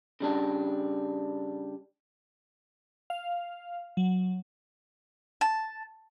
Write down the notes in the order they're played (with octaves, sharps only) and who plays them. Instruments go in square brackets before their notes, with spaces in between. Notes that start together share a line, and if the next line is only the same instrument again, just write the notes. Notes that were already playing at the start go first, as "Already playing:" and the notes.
[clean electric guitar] C#3 G3 D4
[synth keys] F5
F#3
[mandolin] A5